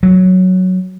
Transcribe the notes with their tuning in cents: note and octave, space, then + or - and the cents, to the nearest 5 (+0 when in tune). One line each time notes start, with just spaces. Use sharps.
F#3 +0